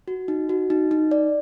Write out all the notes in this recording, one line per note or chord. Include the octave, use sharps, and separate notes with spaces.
F#4
D#4
F#4
D#4
D#4
D5